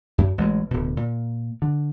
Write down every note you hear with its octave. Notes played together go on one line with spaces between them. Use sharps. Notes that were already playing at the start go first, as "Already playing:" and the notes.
F#2
A1 F#3 G#3
D1 B2
A#2
D3